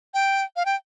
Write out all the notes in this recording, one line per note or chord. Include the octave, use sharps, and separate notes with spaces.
G5
F5
G5